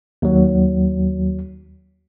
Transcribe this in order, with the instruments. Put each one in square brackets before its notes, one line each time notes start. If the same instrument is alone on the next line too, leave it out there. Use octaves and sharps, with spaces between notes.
[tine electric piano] D#2 F#3